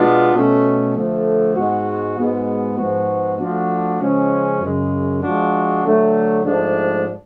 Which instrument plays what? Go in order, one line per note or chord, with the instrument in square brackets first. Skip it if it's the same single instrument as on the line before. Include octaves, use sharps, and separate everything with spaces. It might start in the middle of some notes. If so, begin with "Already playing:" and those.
Already playing: [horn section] B2 G#3 B3 D4 F4
B2 A3 C#4
D3 F3 A3
G#2 G#3 B3 F#4
G#2 G#3 B3 F#4
G#2 F3 G#3 B3 F#4
F3 A3 D4 F#4
C#3 F3 G#3 C#4
F#2 C#3 G#3
F3 G#3 D4 F#4
D3 F#3 A3 D4
G#2 F3 A3 D4